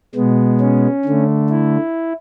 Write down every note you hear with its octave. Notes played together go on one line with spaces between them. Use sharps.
B2 G#3 B3
C#4
D3 A3
E4